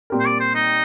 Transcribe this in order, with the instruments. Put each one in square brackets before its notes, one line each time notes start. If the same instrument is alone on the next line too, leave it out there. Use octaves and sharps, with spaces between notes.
[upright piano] A#2 G3 C4 G4 A#4
[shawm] C5
D5
C5
D#4